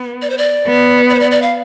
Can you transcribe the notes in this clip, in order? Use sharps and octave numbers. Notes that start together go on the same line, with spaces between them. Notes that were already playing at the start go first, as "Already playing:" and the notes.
Already playing: B3
D5
C5
D5
B3
D5
C5
D5
D5
F5